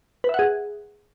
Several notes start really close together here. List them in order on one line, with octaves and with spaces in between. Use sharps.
B4 E5 F#5 G#4